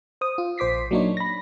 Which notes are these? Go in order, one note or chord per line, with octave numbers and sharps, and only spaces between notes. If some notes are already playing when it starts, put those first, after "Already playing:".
C5 D#6
F4
A#1 C5 D6 B6 C7
F#3 A#3 D4 D#4 C#5
B5 A#6